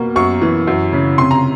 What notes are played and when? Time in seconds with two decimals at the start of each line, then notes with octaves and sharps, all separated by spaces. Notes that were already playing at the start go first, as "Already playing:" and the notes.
Already playing: B2 A#3
0.16 F#2 C#6
0.42 E3
0.67 F#2
0.92 C#3
1.18 C3 C6
1.31 A#5